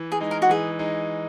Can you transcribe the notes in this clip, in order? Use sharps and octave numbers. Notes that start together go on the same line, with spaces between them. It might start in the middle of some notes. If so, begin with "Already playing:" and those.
Already playing: E3
G#4
G#3 D#4
A#4
F#4
E3 G#4
G#3 D#4